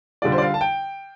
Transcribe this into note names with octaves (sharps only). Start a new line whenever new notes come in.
D3 G3 F4 D5
C5
D5
F5
A5
G5